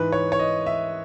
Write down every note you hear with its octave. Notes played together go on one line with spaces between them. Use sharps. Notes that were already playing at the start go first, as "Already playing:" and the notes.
Already playing: G#2 E3 B4
C#5
C#5
D#5
E5